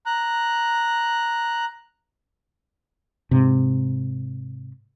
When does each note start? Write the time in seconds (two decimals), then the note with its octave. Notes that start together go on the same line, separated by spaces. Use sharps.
0.06 A#5 F#6
3.31 G#2 C3